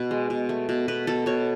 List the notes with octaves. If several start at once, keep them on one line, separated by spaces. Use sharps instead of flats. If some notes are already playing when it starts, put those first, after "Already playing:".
Already playing: B2 B4
G#3
B2
A3
B2
B2 B4
B2 A4
B2 C#5